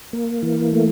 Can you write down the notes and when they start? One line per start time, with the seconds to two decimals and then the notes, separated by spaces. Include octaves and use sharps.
0.13 A#3
0.43 E3
0.73 A3